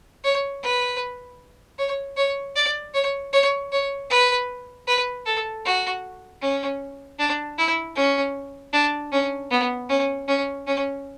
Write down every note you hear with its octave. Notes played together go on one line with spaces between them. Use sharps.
C#5
B4
C#5
C#5
D5
C#5
C#5
C#5
B4
B4
A4
F#4
C#4
D4
E4
C#4
D4
C#4
B3
C#4
C#4
C#4